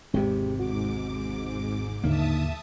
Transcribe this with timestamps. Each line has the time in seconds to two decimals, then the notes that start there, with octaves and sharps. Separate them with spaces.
0.14 G#1 E2 C3 G#3 C4 G4
0.60 G#2 F#4 D6
2.04 D#2 A2 D3 A#3 D#4 E5 A5 D#6